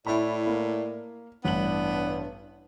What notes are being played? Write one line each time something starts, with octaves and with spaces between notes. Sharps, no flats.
A2 E4 D5 B5
A#3
A1 G2 B3 D4 F#7